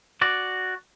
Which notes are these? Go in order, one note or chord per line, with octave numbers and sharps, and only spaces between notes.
F#4 D5